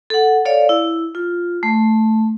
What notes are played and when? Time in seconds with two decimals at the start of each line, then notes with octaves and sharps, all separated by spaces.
0.10 A4 F#5
0.45 A4 C#5 D5 F5
0.69 E4
1.15 F4
1.63 A3